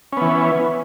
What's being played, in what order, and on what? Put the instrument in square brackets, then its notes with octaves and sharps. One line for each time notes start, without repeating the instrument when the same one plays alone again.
[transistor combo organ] C#4
B3
E3